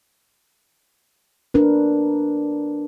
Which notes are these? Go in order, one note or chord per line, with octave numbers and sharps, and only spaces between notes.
D4 A#4 B4